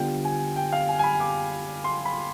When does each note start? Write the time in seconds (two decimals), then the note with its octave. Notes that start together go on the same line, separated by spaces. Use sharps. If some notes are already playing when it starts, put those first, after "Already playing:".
Already playing: D3 G3 B3 D4 F4 G5
0.25 G#5
0.56 G5
0.72 F5
0.89 G#5
0.99 G#5
1.04 B5
1.20 D6
1.84 C6
2.05 B5